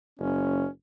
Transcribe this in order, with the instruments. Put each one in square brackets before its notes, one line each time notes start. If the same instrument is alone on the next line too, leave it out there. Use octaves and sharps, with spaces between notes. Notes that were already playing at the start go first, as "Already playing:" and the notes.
[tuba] F#1 [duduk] C#4